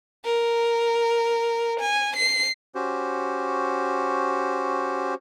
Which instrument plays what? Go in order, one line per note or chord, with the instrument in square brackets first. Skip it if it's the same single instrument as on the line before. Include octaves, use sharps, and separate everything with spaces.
[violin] A#4
G#5
C7
[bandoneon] C#4 F#4 G4 C5